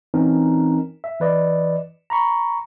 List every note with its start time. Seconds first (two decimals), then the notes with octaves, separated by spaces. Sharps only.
0.14 E3 C4 C#4 D#4 A#4
1.04 E5
1.20 E3 B4 D5 D#5
2.10 A#5 B5 C#6